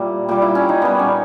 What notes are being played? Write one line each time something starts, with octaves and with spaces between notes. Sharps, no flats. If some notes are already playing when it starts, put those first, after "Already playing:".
Already playing: A#2 G3 E4 G4
A#2 G3 G4
E4
C#4
D#4
A#2 G3 B3
C#4